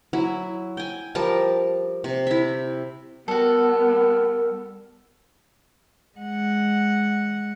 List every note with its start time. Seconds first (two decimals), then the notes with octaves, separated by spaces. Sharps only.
0.13 F#3 E4
0.77 G5 G#5
1.15 F3 G3 A#4 A5
2.04 C3
2.27 E4 E5
3.28 G3 B3 F#4 A4 A#4
6.18 G#3 F#5